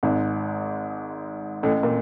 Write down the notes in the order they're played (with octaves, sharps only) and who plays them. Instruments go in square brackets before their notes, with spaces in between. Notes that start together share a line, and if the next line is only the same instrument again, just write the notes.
[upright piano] G#1 G#2
A1 A2
A#2